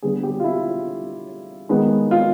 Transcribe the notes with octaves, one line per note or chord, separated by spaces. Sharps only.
D3 G3 B3 G#4
G4
F4
E4
D#3 G#3 B3
F4